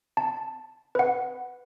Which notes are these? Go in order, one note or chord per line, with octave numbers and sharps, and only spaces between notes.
A5
B4 F#5